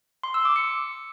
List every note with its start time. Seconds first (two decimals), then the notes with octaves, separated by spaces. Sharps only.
0.23 C6
0.34 E6
0.45 D6
0.56 C#7